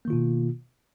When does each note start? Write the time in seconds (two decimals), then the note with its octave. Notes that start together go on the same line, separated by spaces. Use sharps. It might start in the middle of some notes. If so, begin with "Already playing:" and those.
0.05 A#3
0.08 D#3
0.10 F4
0.13 B2